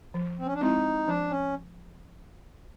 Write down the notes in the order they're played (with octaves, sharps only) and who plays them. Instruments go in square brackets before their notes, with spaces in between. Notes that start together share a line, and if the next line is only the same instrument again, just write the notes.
[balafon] F3
[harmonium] C4
C#4
D4
[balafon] G#3 C4 E4 [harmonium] D#4
[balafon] F3 [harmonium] D4
[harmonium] C#4